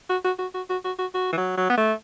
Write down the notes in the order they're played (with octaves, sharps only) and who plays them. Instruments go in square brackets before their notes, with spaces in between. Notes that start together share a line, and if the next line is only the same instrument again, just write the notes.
[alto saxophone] F#4
F#4
F#4
F#4
F#4
F#4
F#4
F#4
E3
F#3
F#3
B3
A3